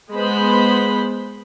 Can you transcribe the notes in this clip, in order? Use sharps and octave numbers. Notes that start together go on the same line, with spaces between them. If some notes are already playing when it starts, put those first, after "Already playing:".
G#3 B3 C5 B5